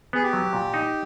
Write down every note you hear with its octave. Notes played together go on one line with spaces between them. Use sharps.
B3 G#4
G4
F#3
A#2
D#4